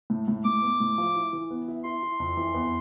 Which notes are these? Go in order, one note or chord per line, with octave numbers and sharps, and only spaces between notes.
A2
A2
A2 D6
B3
A2
F3
E4
E3
B3
E4
E4 C6
E4
F2
E3
E2